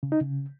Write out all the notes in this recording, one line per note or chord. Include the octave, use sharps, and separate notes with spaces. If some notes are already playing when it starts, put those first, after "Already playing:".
C#3
D#4
C#3